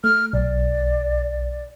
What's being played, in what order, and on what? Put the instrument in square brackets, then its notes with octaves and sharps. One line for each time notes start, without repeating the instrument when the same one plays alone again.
[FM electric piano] A3 [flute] F6
[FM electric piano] B1 [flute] D5